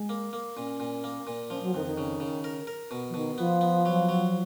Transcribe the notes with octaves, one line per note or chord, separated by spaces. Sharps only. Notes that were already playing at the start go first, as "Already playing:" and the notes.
Already playing: G#3
A#3
A#3
A#2 C#4
A#2
A#3
A#2
F3 C#4
F#3
F2 D#3
D#3
C#3
C#3
A#4
A#4
B2
F3
B2 D#3
F3 B3
B3
F#3
F#3